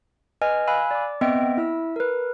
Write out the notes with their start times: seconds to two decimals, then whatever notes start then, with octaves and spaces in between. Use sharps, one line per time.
0.41 B4 D#5 G#5 F6
0.67 F5 G#5 B5 E6 F#6
0.91 D5 D6
1.21 B3 C4 D#5 E5 G5 D7
1.58 E4 E5 E6
1.96 A#4 B4